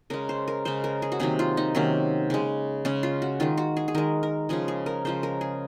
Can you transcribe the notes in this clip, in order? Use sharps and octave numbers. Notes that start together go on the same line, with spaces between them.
C#3 G#3 A#4
C5
A#4
C#3 G#3 C5
A#4
G#4
F#4
C3 D#3 F#3 A#3 G#4
F4
D#4
C3 D#3 F#3 A#3 C#4
C#3 G#3
C#3 G#3 C#4
F4
F#4
D#3 G#3 F4
F#4
G#4
G#4
D#3 G#3 A#4
A#4
C#3 F3 G#3 G#4
G#4
A#4
C#3 F3 G#3 C5
A#4
G#4